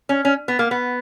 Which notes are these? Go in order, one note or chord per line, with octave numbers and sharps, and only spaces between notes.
C#4
C#4
B3
A#3
B3